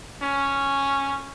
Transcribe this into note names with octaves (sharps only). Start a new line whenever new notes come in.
C#4